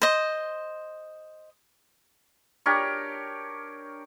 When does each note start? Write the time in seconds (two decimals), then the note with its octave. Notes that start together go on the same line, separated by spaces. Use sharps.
0.02 C5 D#5
2.66 D4 G4 A#4 C#5